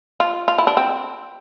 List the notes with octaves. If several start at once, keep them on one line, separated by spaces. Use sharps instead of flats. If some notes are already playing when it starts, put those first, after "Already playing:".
F4
F4
E4
D4
C4